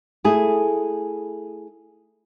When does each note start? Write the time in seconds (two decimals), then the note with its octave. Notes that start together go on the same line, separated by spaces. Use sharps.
0.24 A3 E4 G#4